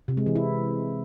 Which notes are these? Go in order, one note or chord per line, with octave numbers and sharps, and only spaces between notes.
C3
G#3
E3
E4